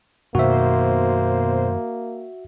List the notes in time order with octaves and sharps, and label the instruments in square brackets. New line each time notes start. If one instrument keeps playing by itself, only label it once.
[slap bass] F#2 D#3 [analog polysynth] B2 C5 [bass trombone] A#3 [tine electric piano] F#4 E5